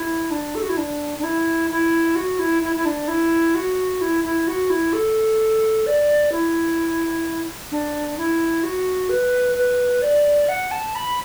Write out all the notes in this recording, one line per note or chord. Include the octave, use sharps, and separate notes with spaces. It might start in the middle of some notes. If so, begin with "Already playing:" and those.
Already playing: E4
D4
A4
F#4
E4
D4
D4
E4
E4
F#4
E4
E4
E4
D4
E4
F#4
E4
E4
F#4
E4
A4
D5
E4
D4
E4
F#4
B4
B4
D5
F#5
A5
B5